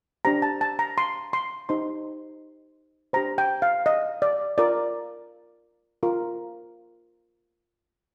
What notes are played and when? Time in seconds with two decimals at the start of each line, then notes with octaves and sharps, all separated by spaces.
0.25 D4 G4 C5 A#5
0.42 A5
0.61 A5
0.79 A#5
0.98 C6
1.33 C6
1.69 D#4 G4 C5 C6
3.13 D4 G4 C5 A#5
3.38 G5
3.62 F5
3.86 D#5
4.22 D5
4.58 F4 A#4 D5
6.03 F4 A#4